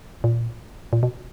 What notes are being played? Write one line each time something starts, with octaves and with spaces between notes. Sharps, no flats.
A#2
A#2
B2